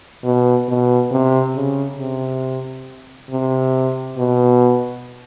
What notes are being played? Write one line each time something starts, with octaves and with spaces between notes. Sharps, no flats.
B2
B2
C3
C#3
C3
C3
B2